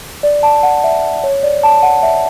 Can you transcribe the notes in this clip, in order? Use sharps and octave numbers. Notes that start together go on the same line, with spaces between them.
D5
A5
F#5
E5
C#5
D5
A5
F#5
E5